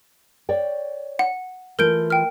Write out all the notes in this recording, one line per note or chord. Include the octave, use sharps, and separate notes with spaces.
C#5 D5 G5
F#5
E3 A3 F4 A#4 G6 D7
G5 F6